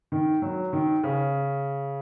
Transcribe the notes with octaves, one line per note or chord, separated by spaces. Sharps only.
D#3
F#3
D#3
C#3